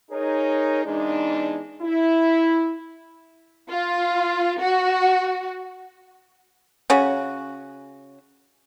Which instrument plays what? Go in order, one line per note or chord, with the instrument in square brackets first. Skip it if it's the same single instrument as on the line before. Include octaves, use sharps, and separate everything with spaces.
[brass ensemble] D#4 G#4 A#4 C#5
E2 G#3 D4 D#4
E4
[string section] F4
F#4
[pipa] C#3 C#4 F#4